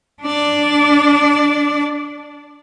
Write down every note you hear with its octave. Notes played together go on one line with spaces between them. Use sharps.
D4 D5